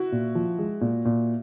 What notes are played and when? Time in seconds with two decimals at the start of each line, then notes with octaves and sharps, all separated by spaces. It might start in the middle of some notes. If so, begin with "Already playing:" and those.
Already playing: E4 F#4
0.12 A#2
0.35 F3
0.59 G#3
0.81 A#2
1.05 A#2